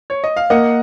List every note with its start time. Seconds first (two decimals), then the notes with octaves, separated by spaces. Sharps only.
0.10 C#5
0.24 D#5
0.36 F5
0.50 A#3 D#5 F#5